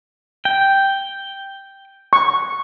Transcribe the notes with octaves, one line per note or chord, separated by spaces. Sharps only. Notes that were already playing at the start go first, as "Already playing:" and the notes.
G5
C#6